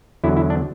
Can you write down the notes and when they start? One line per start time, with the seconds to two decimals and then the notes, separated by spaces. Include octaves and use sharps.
0.24 E2 D3 F#3 E4
0.37 E4
0.50 D4